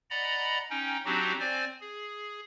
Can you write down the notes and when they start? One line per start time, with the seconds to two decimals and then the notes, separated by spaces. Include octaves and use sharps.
0.10 D5 D#5 F#5 A#5 B5
0.70 C#4 D#4 G5
1.05 F#3 C4 D4 D#4 F#4 G4
1.40 C4 C5 D5 G#5
1.81 G#4